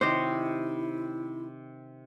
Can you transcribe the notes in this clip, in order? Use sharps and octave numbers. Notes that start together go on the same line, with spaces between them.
C3 D#3 E4 F#4 G4 C5 C#5 D#5